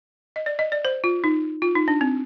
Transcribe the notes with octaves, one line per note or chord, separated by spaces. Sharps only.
D#5
D5
D#5
D5
C5
F4
D#4
F4
D#4
D4
C4